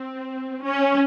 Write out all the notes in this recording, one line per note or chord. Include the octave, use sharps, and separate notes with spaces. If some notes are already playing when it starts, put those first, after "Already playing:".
Already playing: C4
C#4